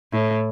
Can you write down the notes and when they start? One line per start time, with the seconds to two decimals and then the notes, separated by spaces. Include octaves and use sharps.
0.12 A2